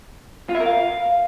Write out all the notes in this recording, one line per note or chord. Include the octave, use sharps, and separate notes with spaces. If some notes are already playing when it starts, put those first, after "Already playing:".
F4
E5
A#4
F5